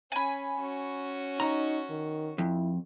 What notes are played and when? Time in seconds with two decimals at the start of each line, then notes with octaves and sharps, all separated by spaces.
0.12 C#4 G#5 B5
0.60 C#4 F#4
1.40 D#4 A#5
1.90 D#3
2.38 F2 E4